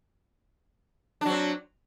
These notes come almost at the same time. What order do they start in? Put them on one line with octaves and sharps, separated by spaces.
D4 F#3 C4